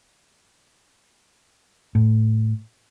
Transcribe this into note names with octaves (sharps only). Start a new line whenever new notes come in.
A2